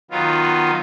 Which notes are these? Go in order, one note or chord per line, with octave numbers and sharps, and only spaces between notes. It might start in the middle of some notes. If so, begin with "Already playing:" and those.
D#3 F#3 B3 F4